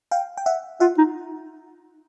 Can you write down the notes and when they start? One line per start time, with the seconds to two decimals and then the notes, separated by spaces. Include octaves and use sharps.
0.11 F5 G5
0.37 G5
0.46 E5 F#5
0.80 F4 E5 F#5
0.98 D#4